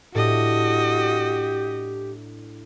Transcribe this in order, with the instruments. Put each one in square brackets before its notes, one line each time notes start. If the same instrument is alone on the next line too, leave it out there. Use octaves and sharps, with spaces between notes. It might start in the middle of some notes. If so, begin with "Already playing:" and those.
[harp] A2 D4 [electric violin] F#4 D#5 [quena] G4